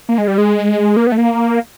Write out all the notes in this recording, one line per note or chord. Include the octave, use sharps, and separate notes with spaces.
A#3
G#3
G3
G#3
A#3
B3
A3
A#3